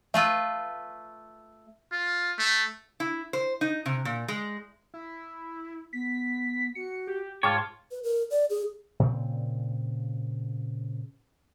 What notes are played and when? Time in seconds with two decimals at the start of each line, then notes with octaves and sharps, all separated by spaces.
0.14 A3 F4 B4 E5 E6
1.92 F4
2.38 A3
3.00 E4
3.33 C5
3.61 D#4
3.86 C3
4.05 A#2
4.28 G#3
4.94 E4
5.93 B3 B6
6.75 F#4 C#7
7.07 G4
7.43 G#2 F4 G#4 C#5 G5 A5 D6
7.91 B4
8.03 A#4
8.31 D5
8.50 G#4
8.99 A#2 C#3 C4